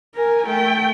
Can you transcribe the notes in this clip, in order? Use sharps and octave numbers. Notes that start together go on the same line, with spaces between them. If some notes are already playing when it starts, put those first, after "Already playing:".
A#4 G#5
A3 G5